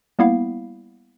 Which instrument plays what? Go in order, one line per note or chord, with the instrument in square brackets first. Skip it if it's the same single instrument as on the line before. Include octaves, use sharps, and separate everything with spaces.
[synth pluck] G3 A#3 B3 E4 F5